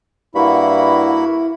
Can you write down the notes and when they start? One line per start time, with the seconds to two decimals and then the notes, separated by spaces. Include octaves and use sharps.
0.35 G2 A#3 E4 F#4 F5 F#5 B5